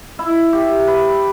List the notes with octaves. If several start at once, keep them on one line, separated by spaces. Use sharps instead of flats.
E4
G4
B4